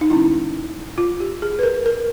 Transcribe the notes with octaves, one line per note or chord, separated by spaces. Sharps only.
D#4
D3 G3 A#3 C#4 E4
F4
G4
G#4
B4
A#4
A#4